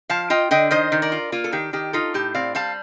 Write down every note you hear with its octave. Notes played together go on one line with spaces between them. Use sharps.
F3 F5 A5
F4 D#5 G5
D3 D#5 G5
D#3 C5 D#5
D#3
A#4 D5
F4
A#3 F4
A4
D#3 G4
D#3 G4
D#4 F4 A4
A2 G4
C4 D5 F5
G3 F5 A5